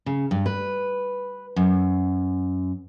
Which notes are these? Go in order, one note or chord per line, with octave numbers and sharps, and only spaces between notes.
C#3
G2
B4
F#2